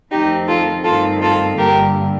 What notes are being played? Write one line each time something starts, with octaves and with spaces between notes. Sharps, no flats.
F2 D#3 A3 C4 D#4 G4
F4 A4
G2 D#3 A3 C4 F4 A4
F4 A4
G2 D3 G3 A#3 G4 A#4